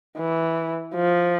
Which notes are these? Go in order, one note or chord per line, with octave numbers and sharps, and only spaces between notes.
E3
F3